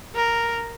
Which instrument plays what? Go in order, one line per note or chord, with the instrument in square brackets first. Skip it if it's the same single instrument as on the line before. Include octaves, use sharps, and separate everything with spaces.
[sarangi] A#4